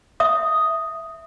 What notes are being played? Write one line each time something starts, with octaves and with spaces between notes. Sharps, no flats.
E5 D#6